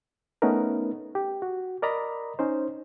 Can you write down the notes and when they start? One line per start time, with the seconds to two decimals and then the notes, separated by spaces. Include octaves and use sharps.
0.42 A3 B3 C#4 D#4 A#4 B4
1.15 G4
1.42 F#4
1.82 A#4 D5 D#5 A#5 B5
2.39 C#4 D#4 C5